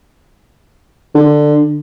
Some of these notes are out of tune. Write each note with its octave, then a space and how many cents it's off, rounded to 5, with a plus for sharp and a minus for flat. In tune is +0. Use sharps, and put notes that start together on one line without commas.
D3 +15